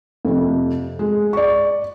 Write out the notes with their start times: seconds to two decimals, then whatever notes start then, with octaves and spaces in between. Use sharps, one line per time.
0.25 F2 C3
0.99 G#3
1.33 D5 C#6